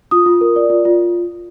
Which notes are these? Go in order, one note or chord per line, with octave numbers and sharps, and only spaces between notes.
F4 D#6
F4
A#4
D5
F4
F4